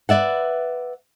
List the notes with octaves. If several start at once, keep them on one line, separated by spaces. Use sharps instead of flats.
B4 C#5 D5 E5 F#5